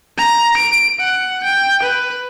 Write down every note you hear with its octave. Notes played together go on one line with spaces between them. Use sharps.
A#5
D7
F#5
G5
B4